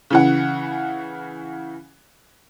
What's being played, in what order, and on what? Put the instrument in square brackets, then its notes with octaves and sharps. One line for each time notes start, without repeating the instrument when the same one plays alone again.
[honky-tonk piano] C#3 E3 F#5